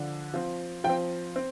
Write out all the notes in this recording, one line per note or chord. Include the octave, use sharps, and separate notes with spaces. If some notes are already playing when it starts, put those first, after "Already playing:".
Already playing: D3 F3 D4
F3 C4
F3 G5
C4
C4